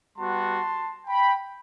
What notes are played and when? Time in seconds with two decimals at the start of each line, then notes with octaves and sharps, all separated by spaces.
0.18 G3 B3 F#4 A5 C6
1.07 G5 B5